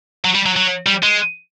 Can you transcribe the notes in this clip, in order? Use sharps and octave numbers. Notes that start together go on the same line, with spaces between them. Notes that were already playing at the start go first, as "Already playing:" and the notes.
F#3
G3
F#3
F#3
G3
G#3